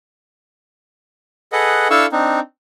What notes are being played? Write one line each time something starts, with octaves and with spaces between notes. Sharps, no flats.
G#4 A4 B4 D#5 F#5
D4 E4 A4 F5 C#6 E6
C4 D4 D#4